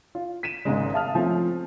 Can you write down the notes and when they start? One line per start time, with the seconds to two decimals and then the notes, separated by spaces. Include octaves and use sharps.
0.15 F4
0.43 B6 D#7 E7
0.65 G#1 G#2 C#3 G#3
0.94 E5 F5 A5 D#6 F6
1.15 F3 A3 C4 C#4